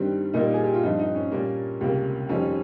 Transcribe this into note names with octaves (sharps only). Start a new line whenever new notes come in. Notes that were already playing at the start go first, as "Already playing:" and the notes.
Already playing: G2 D#3 G3 C4
A#2 G3 A#3 D#4
G#4
G4
F4
G2 F3 C4 D#4
D#4
C#4
A#2 G3 A#3
C#2 C3 G3 A#3
F2 D#3 G3 C4 C#4